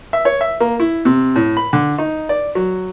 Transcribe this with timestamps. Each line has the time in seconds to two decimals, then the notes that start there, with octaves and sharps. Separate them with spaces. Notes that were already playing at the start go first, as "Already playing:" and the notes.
0.13 E5
0.25 C#5
0.41 E5
0.60 A#3
0.80 E4
1.05 C3
1.36 A2
1.57 B5
1.73 D3
1.98 D#4
2.29 D5
2.55 F#3